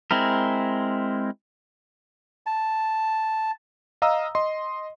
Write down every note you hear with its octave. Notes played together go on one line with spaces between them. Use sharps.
G#3 C4 E4 A#4
A5
D#5 F5 A#5 D#6 E6
D#5 C6